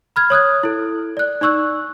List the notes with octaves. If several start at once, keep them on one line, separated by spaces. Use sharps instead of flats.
B5 F6 G#6
C#5 D#6 F#6 G#6
E4 A4
D5 F#6
D#4 D5 C#6 E6 F#6